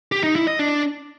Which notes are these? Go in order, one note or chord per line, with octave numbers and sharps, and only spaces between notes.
G4
D#4
E4
D#5
D4